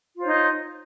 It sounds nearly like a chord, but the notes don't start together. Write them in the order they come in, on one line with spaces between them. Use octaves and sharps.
F4 C5 C#5 D#4